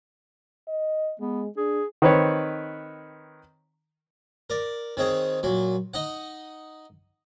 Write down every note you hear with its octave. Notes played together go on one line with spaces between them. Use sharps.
D#5
G#3 B3
D4 G#4
D#3 C4 B4 C#5
A#4 D5
D#3 C4 G#4 C#5
A#2 F#3
D#4 D#5 F#5